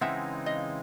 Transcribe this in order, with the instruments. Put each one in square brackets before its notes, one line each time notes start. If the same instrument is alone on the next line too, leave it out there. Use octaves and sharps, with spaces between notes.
[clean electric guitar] C#3 E3 G#3 C4 D#4 [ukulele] E5 F#5
[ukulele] D#5 F5